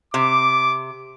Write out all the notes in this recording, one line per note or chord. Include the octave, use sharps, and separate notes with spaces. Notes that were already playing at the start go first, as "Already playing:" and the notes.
C3 D6